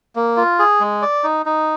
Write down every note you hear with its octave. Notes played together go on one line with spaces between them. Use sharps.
A#3
F4
G#4
G#3
D5
D#4
D#4